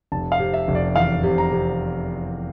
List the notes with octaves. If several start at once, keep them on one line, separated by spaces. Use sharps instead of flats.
F1 A5
F5
C3
E5
F1
D5
E2 F5
C3
A#5
C3